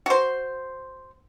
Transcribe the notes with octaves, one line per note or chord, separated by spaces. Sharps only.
F#4 C5